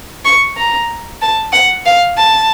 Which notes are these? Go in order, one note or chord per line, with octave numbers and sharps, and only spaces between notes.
C#6
A#5
A5
F#5
F5
A5